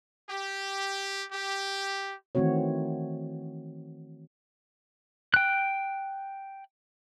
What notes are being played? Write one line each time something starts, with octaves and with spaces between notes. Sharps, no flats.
G4
G4
D#3 E3 A3 C4 F#4 C#5
G5 F#6